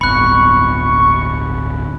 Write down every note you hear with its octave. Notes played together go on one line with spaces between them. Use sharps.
D1 G1 B5 C#6 F#6